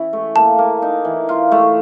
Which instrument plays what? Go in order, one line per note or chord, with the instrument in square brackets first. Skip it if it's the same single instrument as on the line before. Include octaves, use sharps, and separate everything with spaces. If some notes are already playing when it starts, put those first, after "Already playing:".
Already playing: [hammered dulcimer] E3 C#4 E4
A3
[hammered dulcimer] A#3 [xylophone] A5
[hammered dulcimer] A#3
D#4
E3
F4
A3